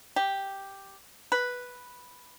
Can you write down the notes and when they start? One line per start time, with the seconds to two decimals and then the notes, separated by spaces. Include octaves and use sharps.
0.16 G4
1.32 B4